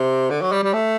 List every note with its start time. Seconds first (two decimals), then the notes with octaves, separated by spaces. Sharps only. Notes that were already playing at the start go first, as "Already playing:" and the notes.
Already playing: C3
0.30 D3
0.41 F#3
0.52 G3
0.63 G3
0.73 A3